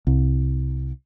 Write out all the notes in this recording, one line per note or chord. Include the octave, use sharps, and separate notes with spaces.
C2